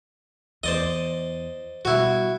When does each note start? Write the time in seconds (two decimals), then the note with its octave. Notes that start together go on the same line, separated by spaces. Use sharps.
0.64 E2 C5 D5 D#5
1.85 B2 G3 E4 F#4